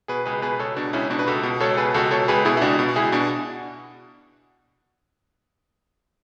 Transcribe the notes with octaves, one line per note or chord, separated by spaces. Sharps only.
B2 G#4 B4
C#2 G#4 B4
B2 G#4 B4
C#2 A4 C#5
B2 D4 F#4
C#2 C#4 E4
B2 D4 F#4
B4
C#2 F#4 A4
B2
C#2 A4 C#5
A4
B2 G#4 B4
C#2 F#4 A4
B2 A4 C#5
C#2 G#4 B4
B2 E4 G#4
E4
C#2 D4 F#4
B2
F#4
C#2 E4 G#4
B2 D4 F#4